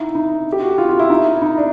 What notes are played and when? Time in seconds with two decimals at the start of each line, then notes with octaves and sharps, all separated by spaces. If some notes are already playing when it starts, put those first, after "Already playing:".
Already playing: D#4 E4
0.15 D#4
0.52 G4
0.62 F#4
0.78 F4
0.89 F4
0.99 E4
1.10 D#4
1.35 E4
1.42 D#4
1.58 D4